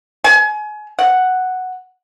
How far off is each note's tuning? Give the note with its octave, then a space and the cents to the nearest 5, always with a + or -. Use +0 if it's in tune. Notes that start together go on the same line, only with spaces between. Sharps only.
G#5 +30
F#5 +0